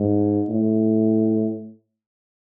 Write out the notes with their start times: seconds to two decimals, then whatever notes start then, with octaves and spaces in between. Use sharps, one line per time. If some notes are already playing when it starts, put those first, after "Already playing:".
Already playing: G#2
0.49 A2